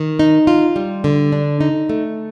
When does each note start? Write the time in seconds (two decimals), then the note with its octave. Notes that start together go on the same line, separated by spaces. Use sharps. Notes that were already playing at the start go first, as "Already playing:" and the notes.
Already playing: D#3
0.19 D#4
0.47 F4
0.76 G3
1.04 D3
1.32 D4
1.61 D#4
1.89 A3